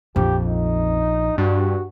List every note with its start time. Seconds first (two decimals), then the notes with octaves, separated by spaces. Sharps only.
0.16 A#1 F2 F3 G4
0.48 D#4
1.38 G2 F#4